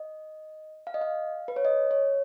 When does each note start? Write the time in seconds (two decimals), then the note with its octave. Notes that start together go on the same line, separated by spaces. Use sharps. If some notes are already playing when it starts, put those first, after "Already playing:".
Already playing: D#5
0.87 F5
0.94 D#5
1.01 F5
1.48 B4
1.56 C#5
1.65 D#5
1.91 C#5